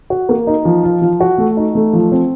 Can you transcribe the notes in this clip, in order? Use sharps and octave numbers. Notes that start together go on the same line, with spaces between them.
F#4
A#3
D#4
F3
F4
F3
F#4
A3
D#4
A3
F3
C4